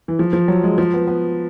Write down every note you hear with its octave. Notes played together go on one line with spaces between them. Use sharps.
E3
F3
F3
F#3
G#3
F3
B3
B3